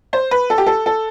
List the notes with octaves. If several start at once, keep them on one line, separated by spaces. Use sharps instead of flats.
C5
B4
A4
G4
A4
A4